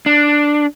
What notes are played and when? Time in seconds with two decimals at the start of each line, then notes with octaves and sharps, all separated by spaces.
0.06 D4